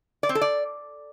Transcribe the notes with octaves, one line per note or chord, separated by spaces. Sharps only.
D5
C4
A4
D5